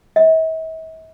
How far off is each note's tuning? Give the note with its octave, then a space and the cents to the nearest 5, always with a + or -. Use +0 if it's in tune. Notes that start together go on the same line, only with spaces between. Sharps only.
E5 -45